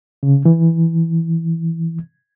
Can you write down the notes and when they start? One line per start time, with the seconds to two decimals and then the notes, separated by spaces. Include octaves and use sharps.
0.23 C#3
0.45 E3